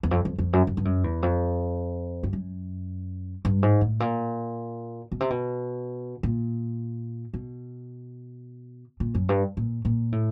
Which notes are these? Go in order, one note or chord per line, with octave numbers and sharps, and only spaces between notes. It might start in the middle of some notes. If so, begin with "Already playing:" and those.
E2
F2
F2
F2
F#2
F#2
G2
F#2
E2
F2
G2
F#2
G2
G#2
A2
A#2
B2
C3
B2
A#2
B2
A#2
F#2
G2
A#2
A#2
A2